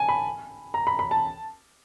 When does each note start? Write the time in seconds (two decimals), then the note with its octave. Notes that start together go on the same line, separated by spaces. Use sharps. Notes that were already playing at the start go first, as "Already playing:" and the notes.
Already playing: G#5 A5
0.09 B5
0.74 A#5
0.87 B5
0.99 B5
1.11 A5